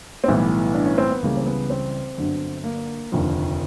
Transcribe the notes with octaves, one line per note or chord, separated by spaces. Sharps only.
C4
B1 A2 E3 G3 B3
D4
C#4
C4
B3
C#2 C#3 E3 G3 A#3
C4
B3
C4
G1 G2 D3 F#3
A#3
F1 D#2 D3 F3